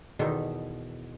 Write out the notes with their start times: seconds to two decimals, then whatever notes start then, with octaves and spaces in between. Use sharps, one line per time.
0.19 E2 B2 D#3 A4 C6